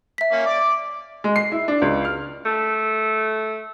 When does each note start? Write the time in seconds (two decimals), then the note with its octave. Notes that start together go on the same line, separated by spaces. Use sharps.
0.18 E5 B6
0.32 A#3 C#4
0.46 D5 D6
1.24 G#3
1.36 C7
1.52 E4
1.68 D4
1.82 C#2
2.05 F6
2.45 A3